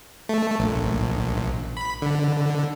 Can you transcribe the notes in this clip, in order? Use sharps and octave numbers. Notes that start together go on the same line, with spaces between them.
A3
A#1
B5
D3